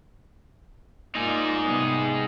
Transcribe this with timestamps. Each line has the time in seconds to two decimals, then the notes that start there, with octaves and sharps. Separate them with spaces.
1.15 A#3 D#4 F4 G#4 D5
1.62 C3 G3 B3